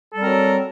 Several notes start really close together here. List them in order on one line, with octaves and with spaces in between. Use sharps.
A4 G3 C4 A#4 F#3